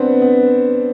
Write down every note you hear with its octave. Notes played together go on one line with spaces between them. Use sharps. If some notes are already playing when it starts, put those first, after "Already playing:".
Already playing: B3 C4 D4
B3